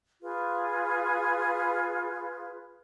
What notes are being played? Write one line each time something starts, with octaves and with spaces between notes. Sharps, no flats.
F4 G#4 B4